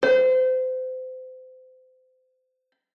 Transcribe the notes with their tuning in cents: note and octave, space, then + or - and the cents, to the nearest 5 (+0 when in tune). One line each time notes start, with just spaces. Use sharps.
C5 -30